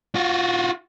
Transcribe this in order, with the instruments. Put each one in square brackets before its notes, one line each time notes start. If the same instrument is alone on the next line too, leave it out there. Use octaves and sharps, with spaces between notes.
[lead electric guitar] F4 F#4